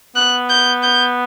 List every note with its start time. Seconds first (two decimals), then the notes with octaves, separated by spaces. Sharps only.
0.16 B3 F#6
0.49 G6
0.82 G6